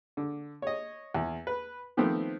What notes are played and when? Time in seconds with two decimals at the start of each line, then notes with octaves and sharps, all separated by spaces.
0.17 D3
0.62 C#5 D#5
1.15 E2
1.47 B4
1.97 D#3 F3 A3 B3 C4